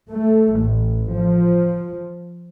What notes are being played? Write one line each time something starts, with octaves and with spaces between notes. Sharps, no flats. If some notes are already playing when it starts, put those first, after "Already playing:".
A3
A1
F3